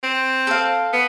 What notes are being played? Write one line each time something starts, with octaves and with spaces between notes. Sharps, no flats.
C4
A4 F5
B3